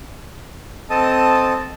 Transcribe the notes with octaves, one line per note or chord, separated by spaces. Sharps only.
C4 A4 D#5 A5 D#6